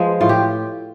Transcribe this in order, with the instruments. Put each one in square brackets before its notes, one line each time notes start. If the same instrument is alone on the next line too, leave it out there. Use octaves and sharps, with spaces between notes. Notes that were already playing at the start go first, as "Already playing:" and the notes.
Already playing: [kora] F3 G#3 B4
A2 F4
G4